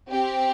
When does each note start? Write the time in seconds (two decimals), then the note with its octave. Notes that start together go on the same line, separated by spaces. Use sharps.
0.10 C4 G4